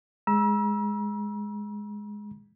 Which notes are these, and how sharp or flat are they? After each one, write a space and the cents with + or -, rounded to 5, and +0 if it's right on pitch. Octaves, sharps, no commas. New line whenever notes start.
G#3 +0 A#5 +45 E6 +0